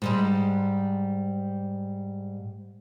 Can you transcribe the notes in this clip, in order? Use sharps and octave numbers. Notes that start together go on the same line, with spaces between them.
G#2 G3 G#3